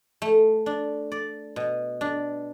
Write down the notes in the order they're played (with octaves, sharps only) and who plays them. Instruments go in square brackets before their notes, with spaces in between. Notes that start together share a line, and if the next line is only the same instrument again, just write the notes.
[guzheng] A3
D4
D5
B2
D4